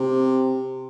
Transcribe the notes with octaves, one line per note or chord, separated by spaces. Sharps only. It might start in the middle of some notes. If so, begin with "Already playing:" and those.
Already playing: C3